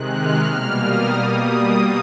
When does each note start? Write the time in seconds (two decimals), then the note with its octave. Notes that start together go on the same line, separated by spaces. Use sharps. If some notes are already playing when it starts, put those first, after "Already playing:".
Already playing: C3 D#3 G#3 F#6
0.09 F6
0.43 B2 G3 A#3
0.79 D#6
1.13 B2 G3 A#3 D#6